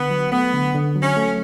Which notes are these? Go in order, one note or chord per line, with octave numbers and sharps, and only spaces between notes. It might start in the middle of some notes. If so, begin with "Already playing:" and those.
Already playing: D3 B3
F#3
A3 B3
D3
D3
F#3
C#4
A3